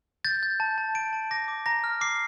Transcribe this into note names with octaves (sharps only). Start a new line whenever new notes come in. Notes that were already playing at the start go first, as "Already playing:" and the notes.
G6 A6
G6
A5
A5
A5 D7
A5
D6 A#6
D6
A#5 A#6
F6
D6 C7